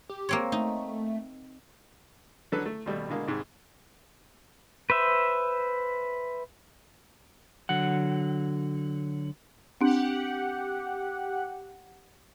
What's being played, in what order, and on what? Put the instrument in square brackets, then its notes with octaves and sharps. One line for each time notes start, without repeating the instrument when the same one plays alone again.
[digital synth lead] G4
[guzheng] A#3 C4 C#5
[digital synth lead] A3 [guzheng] D#4
[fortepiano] D3 F#3 A4 B4
A3
D#2 B2 G3 A3
B2 D3 G#3 A#3
C2 G#2 D#3 G#3
[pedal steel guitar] B4 C5 E5
[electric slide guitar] D3 F#3 F#5
[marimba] C4 D4 [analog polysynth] G4 F#5